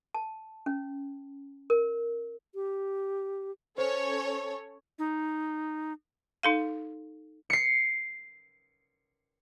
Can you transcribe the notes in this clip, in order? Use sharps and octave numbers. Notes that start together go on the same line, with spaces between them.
A5
C#4
A#4
G4
C#4 A4 C5 C#5
D#4
D#4 A4 F5
C7 C#7